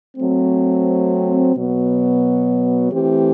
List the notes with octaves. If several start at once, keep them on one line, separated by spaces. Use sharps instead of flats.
F#3 A3 C4
B2 F#3 B3
E3 A3 C4 E4 G4